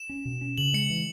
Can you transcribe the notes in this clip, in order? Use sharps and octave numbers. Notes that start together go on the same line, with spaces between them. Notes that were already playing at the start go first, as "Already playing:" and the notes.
Already playing: E7
C#4
B2
C#4
C#3 F#7
G#3 C#7
E3